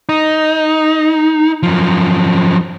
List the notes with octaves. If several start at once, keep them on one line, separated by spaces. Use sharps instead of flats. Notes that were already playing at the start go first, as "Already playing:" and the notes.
D#4
F#2 F3